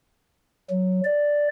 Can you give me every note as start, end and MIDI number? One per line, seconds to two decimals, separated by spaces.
0.70 1.01 54
1.04 1.48 74